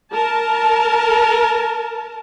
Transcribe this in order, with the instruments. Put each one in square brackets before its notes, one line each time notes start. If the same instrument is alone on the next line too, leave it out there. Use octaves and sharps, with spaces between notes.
[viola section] A#4 A5